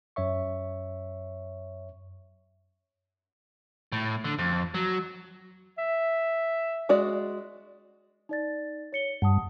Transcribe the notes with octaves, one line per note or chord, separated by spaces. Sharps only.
F#2 C#5 E5 C#6
A2
D3
F2
F#3
E5
G#3 F#4 D5
D#4 D5 A6
C#5 C#7 G7
G2 F#5 A5 D#6